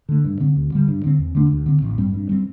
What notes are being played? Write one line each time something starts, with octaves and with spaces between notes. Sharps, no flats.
D3 A3
G2
D3 C4
D2
D3 G3
G2
D3 C4
E2
D3 A3 D4
D2
D3 C4
A1
G2 G3 C4
G2
G3 C4